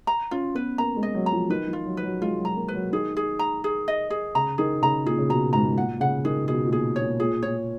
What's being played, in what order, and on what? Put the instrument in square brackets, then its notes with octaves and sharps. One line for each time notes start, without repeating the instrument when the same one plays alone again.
[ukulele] A#5
[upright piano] C#4 [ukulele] F4
[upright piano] B3 [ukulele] B4
[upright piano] A#3 [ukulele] A#5
[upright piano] G#3
[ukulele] D#5
[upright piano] F#3
[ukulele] A#5
[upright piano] F3
[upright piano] D#3 [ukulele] B4
[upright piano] F3
[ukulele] F4
[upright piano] F#3
[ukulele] B4
[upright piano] F#3
[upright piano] G#3 [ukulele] F4
[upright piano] F#3
[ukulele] A#5
[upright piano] A#3
[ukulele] B4
[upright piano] F#3
[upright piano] D#3 [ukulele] G#4
[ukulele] G#4
A#5
G#4
D#5
G#4
[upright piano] C#3 [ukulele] A#5
[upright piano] D#3 [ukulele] G#4
[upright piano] C#3 [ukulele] A#5
[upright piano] A#2 [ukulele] G#4
[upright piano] C#3
[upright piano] B2 [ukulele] A#5
[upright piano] G#2 [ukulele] A#5
[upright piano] A#2 [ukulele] F#5
[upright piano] C#3 [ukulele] F#5
[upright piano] D#3 [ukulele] G#4
[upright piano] B2 [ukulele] G#4
[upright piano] A#2
[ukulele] G#4
C#5
[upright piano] A#2
[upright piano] A#2 [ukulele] G#4
[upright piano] A#2 [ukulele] C#5